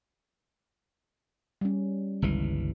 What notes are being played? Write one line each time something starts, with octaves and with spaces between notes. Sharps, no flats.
G3 C#4
G1 C#2 E3